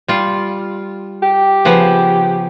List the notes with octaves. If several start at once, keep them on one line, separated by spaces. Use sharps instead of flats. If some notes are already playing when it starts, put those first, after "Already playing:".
G3 F4
G4
C#3 F3 B3